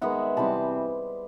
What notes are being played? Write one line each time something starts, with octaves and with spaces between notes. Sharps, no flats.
D#3 G#3 B3 E5 F#5
C3 E3 G3 C4 A5 B5